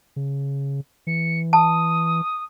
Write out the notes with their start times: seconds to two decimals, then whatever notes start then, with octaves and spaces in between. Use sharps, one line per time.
0.16 C#3
1.07 E3 C#7
1.53 A5 D#6